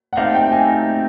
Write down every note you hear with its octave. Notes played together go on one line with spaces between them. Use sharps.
F#5
A3 C4 D#4 G4 F5
G5
G#5